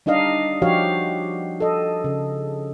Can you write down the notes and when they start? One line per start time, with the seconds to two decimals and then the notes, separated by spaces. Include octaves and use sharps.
0.06 G3 D4 D#4 D#5 F5
0.62 F3 F#4 G4 C#5 F5
1.60 A4 D#5
2.04 C#3